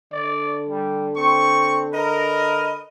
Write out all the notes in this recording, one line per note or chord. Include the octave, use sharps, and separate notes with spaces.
D3 D5
G3
C4 C#6
A#4 B4 D#5